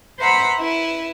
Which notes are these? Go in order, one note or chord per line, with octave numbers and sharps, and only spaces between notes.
B4 C5 E5 F#5 A#5 B5
E4 B4